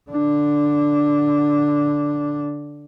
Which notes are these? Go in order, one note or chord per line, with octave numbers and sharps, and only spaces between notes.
D3 D4